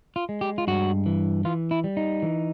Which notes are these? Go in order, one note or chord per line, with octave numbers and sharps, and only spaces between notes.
F4
G#3
G4
F4
G2 F#4
E3
E3 F4
E4
G3
D#4
E3